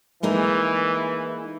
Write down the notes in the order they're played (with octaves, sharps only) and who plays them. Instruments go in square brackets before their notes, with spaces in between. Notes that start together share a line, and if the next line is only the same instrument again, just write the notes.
[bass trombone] E3 [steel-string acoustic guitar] G#3 A#3 D#4